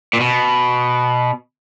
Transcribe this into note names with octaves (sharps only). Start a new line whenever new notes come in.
A#2
B2